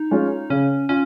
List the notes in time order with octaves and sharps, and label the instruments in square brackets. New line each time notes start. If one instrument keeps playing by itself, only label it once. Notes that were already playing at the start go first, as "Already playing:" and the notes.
Already playing: [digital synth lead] D#4
[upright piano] G#3 C#4 F4
[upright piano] C#3 [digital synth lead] C#4
[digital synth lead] C#4 [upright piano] F4